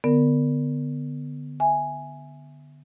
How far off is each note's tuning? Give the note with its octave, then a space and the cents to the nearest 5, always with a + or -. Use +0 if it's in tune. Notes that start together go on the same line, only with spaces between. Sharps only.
D3 +0 B3 +0 A#4 -10
E5 +0 G#5 +0